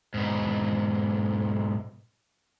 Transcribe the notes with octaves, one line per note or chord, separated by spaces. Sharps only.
G#2 B2